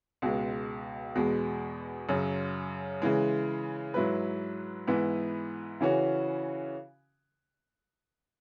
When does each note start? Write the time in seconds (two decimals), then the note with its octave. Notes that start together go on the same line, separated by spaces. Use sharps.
0.22 C#2 B2 G#3
1.15 E2 B2 G#3
2.09 F#2 C#3 F#3
3.02 C#3 E3 G#3
3.94 G#2 F#3 E4 B4
4.87 G#2 E3 B3 E4
5.81 C#3 E3 C#4 F#4